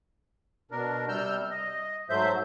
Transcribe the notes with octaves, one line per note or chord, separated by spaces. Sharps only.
B2 D4 A#4
C3 G3 E6 F6 G6
D#5
G#2 F#3 A3 C5 E5 G6